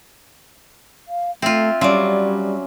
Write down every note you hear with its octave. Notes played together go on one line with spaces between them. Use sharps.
F5
A3 C4 F4 E5
F#3 G3 C#4 F4 D5